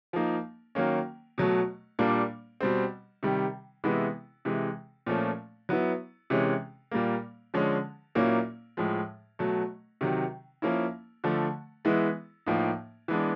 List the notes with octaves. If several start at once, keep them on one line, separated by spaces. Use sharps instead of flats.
F3 A#3 D#4
D#3 F#3 A#3 C#4
B2 F#3 A3
A#2 G3 A#3 D4
B2 G3 C4
C3 D#3 G3
C3 E3 G#3 B3 E4
C3 E3 G#3
A#2 F3 A3 C#4
F#3 B3 E4
C3 E3 G#3 C#4
A#2 G3 A#3
D3 F3 G#3 C#4
A#2 F#3 A#3 C#4 E4
A2 F3 G#3
B2 F#3 A3
C3 D#3 F#3
F3 A#3 C#4 E4
D3 F3 A3
E3 G#3 B3 E4
A2 F3 A#3 D#4
E3 G#3 B3 D4